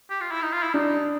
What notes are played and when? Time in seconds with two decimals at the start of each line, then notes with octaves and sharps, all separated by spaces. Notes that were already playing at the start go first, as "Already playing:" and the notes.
0.10 G4
0.21 F4
0.31 E4
0.42 D#4
0.52 F4
0.63 E4
0.74 D4 D#4